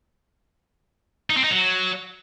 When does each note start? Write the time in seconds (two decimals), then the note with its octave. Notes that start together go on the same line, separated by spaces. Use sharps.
1.30 D#4
1.37 C4
1.44 D#4
1.51 F#3